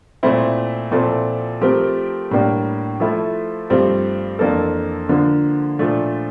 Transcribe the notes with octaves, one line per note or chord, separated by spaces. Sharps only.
A#2 A3 C4 E4
A#2 F3 C4 E4 A4
F3 A3 C4 G4 A#4
A2 G3 A#3 D4
F3 A3 E4 A4
G2 F3 A3 C4
F2 E3 A#3 D4 A4
D3 F3 A#3
A#2 F3 A3 D4